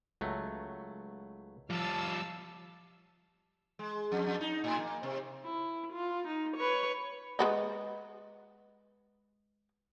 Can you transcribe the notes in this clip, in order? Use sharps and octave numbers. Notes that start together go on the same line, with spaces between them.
C#2 F#3 A3
F3 G3 F4 F5 A5 E6
G#3
F2
F2
D#4
A2
A#3
C3
E4
F4
D#4
B4 C#5
G#3 B3 D#4